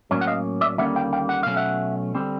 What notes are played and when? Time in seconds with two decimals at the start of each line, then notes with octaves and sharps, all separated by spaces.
0.11 A2 F#3 A#3 C#4
0.21 F#5
0.27 D#5 F5
0.61 D5 E5
0.78 D#2 D3 G3 A#3 C#4 E5 F#5
0.95 F5 G5
1.13 F5 G5
1.29 F#5
1.43 B2 F#3 A3 C#4 F5
1.56 E5 F#5
2.15 D3 G3 C4